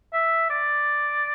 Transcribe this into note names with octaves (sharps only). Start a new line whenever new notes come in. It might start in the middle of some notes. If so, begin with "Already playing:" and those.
E5
D5